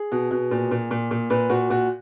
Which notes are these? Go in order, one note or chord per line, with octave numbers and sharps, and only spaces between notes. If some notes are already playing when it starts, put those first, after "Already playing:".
Already playing: G#4
B2
B2
A#2
A#2
A#2
A#2
A#2 B4
A#2 F#4
A#2 F#4